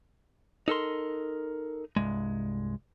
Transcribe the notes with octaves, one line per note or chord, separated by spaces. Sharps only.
D#4 A4 A#4 C6
C2 G2 G#3